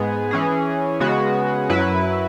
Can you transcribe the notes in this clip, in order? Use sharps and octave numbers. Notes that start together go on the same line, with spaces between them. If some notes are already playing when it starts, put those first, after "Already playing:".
Already playing: G#2 G#3 B3 G#4
E3 C#4 G#4
C#3 G#3 B3 F#4
F#2 F#3 E4 B4